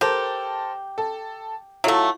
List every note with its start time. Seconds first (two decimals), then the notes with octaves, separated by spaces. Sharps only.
0.01 G4 A4 A#4 C5
0.98 A4
1.84 F#3 A3 E4 F4 A4